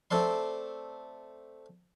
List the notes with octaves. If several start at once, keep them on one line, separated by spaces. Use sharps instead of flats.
A3 C4 A4 D5 C6